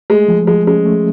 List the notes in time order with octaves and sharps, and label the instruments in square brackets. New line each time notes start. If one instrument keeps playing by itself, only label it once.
[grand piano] G#3 [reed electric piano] A3
[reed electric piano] F3
[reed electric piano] F3 [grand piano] G#3
[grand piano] G#3 [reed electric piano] C#4
[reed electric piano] A3